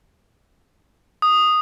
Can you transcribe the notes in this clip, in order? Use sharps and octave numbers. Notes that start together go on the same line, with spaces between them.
D#6